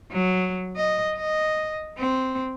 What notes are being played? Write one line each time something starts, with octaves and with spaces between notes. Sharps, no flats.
F#3
D#5
D#5
C4